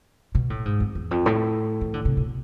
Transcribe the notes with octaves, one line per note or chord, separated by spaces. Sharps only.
B2
A2
G#2
F2
E2
F2
A2
E3
D3
C3
B2